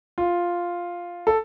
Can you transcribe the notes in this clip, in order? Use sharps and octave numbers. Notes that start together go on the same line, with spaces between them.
F4
A4